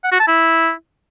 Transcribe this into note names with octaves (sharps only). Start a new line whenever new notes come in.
F#5
F#4
A5
E4